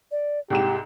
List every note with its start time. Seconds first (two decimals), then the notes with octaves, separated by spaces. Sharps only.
0.12 D5
0.50 C2 G#2 G4 G5 E7